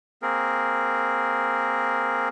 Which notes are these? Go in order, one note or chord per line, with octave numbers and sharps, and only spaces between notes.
A#3 C4 G#4 A#4